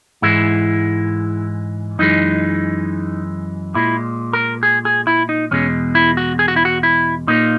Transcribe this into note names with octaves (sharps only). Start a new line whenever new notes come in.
G#2 E3 G#3 E4
F#2 E3 G#3 D#4
A#2 G#3 E4
A#4
G#4
G#4
E4
D#4
E2 B2 G#3 C#4
E4
F#4
G#4
F#4
E4
F#4
E4
A#2 A#3 D#4